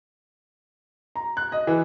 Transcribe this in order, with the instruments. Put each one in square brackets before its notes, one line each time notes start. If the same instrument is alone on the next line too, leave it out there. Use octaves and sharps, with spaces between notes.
[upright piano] A#5
F#6
D#5
E3